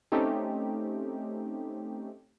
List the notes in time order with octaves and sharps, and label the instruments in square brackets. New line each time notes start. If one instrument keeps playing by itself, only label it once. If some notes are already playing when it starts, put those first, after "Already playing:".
[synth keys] A3 C4 C#4 D#4 G4